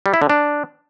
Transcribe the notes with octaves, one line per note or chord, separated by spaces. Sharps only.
G3
E4
D3
D4